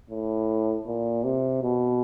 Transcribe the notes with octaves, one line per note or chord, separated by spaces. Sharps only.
A2
A#2
C3
B2